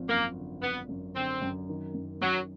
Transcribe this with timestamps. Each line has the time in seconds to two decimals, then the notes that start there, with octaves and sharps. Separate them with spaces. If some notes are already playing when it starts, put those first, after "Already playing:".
Already playing: G#1 F3
0.08 F#2 A#3
0.36 D3
0.62 G#1 B3
0.89 F#2
1.15 D3 C4
1.42 F#2
1.69 D#3
1.95 F#2
2.21 F#2 F#3